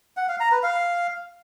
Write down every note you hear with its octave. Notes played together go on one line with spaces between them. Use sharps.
F#5
F5
A#5
B4
F5